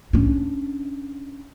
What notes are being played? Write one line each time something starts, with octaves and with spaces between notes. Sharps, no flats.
C#4 D4